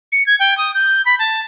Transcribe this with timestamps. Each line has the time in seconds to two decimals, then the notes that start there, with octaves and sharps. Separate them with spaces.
0.12 C#7
0.26 G#6
0.40 G5
0.58 D#6
0.74 G6
1.06 B5
1.19 A5